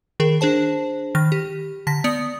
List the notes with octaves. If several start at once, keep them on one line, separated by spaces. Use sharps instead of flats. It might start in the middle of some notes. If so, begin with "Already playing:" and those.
D#3 G#4 A#4
D4 G#4 C5 A5
D#3 F6 A#6
G4
D3 A5 A#6 B6
B3 D5 D#6 C#7